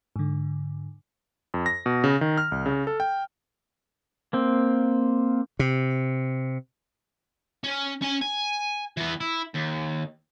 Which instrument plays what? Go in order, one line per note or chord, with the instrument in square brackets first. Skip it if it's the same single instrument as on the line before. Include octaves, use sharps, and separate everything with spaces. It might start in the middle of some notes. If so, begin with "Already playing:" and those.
[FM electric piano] G#2 D3
[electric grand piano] F2
A#6
B2
C#3
D#3
F6
C2
C#3
A4
G5
[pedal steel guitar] A#3 C4
[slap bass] C3
[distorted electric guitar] C#4
C#4 G#5
G#5
E3 B3
E4
D#2